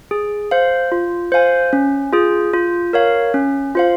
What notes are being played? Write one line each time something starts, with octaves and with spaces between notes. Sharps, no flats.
G#4
C5 F5
F4
C5 F5 G#5
C#4
F4 G#4
F4
A#4 C#5 F5
C#4
F4 C5 F5